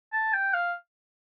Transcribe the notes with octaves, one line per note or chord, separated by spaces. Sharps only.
A5
G5
F5